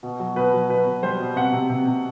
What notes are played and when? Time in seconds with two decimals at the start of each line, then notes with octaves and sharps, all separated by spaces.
0.03 B2
0.19 F#3
0.36 B2 B4
0.53 F#3
0.70 B2 B4
0.86 B2
1.03 G3 C5
1.19 B2
1.36 C3 F#5
1.52 C3
1.70 C3
1.87 C3